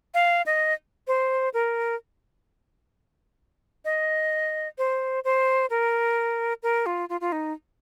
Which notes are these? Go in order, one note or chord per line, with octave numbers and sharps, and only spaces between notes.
F5
D#5
C5
A#4
D#5
C5
C5
A#4
A#4
F4
F4
F4
D#4